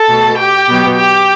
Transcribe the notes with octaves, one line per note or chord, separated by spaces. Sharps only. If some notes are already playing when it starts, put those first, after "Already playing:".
Already playing: A4 A5
B2 A3
G4 G5
B2 F#3 B3
G4 G5